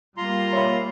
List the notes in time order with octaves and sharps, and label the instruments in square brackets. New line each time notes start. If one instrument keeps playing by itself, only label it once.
[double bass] G3 A#3 [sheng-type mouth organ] F4 A#5 C6
[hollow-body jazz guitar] C#5 E5 B5